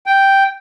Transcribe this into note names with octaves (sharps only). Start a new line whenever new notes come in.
G5